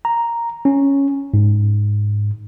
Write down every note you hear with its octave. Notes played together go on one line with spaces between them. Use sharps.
A#5
C#4
G#2